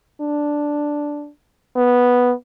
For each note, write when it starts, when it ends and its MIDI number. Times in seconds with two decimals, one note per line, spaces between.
0.21 1.29 62
1.76 2.33 59